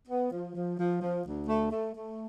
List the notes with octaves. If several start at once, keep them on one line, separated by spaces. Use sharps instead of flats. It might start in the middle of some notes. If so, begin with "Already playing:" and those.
B3
F3
F3
F3
F3
D2
A3
A3
A3